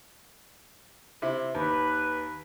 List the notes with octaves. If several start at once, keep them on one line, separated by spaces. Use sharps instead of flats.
C3 E4
D#2 B4